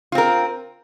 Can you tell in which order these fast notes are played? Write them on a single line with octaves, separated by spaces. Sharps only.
F4 C4 A#4